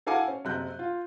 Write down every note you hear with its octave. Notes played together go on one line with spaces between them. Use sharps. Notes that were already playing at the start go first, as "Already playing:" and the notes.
E4 A4 F5 F#5 G#5 D6
C#4
F#1 C3 F#6 G6
F4